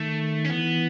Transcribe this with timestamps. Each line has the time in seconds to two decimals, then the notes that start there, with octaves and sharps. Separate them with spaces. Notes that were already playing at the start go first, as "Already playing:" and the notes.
Already playing: D#3 A3
0.44 C#4
0.49 E3 B3